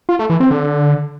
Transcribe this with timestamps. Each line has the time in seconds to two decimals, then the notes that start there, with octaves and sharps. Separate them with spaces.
0.09 F4
0.19 A3
0.30 E3
0.40 C4
0.51 D3